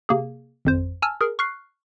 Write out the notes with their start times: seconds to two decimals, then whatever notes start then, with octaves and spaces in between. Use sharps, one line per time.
0.09 C3 A#3 G#4
0.65 G#1 F2 C5
1.02 G#5 A5 E6 F6
1.21 G#4 A#4
1.39 C#6 F6 F#6 C7